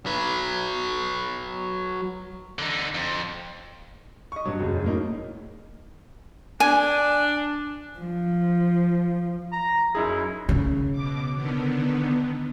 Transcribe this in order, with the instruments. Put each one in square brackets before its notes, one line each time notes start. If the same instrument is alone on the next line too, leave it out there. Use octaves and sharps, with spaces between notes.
[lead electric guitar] F#3 B4
[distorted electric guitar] D3 D#4
F2
[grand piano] D#5 C#6
G2 F#3
E1 F#2 C#3
A2 A#3 D#4
[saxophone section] D4 [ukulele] G#5
[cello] F3
[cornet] A#5
[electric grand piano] F#2 D#4 G#4 [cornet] E4
[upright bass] C#3
[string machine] B2 D6
D3 D#3 B3